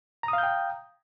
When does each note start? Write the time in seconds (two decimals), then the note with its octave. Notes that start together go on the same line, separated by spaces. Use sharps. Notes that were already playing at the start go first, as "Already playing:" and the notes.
0.23 A#5
0.28 D#6
0.33 F5
0.38 G6
0.43 G5